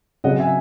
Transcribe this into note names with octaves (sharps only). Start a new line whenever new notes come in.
C#3 F#3 C4 D#5 F#5
E5 G#5